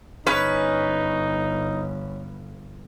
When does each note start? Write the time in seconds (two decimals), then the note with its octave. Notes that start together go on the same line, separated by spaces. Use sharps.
0.27 G1 C#4 D#4 B4